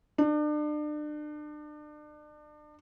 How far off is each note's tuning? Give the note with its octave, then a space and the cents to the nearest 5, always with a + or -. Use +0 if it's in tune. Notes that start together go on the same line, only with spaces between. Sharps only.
D4 +35